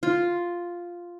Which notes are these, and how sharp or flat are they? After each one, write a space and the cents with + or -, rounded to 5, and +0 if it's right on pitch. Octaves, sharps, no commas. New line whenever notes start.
F4 +0